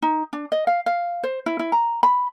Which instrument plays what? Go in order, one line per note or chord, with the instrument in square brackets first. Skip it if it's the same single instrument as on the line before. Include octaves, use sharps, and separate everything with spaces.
[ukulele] D#4
D4
D#5
F5
F5
C5
E4
E4
A#5
B5